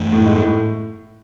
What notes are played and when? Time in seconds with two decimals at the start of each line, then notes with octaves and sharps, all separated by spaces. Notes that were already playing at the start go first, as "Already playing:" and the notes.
Already playing: F#2 E3 A3 D4
0.12 A2
0.26 G#2
0.36 A2